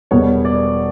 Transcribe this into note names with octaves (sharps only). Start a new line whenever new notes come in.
E1 E2 B2 G3 B3 C#5
D5